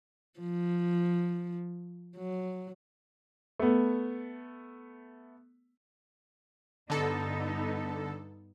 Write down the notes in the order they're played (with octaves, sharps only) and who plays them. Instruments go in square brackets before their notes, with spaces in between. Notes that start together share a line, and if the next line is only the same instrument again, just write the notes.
[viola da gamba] F3
F#3
[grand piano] A3 B3
[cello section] G2 B3 D#4 [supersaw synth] D3 A4